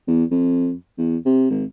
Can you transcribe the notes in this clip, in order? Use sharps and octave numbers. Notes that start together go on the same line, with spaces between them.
E2
F2
E2
C3
G#1